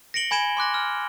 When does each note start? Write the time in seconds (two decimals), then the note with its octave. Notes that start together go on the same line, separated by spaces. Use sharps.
0.14 A#6 C#7 D7 F#7 G7
0.31 G#5 B5 G#6 D7 E7 G7
0.57 C6 D6 F#6 A#6
0.74 F6